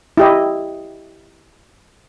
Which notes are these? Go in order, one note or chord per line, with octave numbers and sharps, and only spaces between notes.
E4 G4 D#5